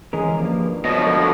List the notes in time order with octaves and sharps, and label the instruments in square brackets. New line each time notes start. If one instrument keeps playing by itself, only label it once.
[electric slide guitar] E3 C#4 A#4 [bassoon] G#3
[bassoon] G2 [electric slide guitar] F3 A#3
[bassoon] F#2 [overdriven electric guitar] B2 F3 [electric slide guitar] D#5
[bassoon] D3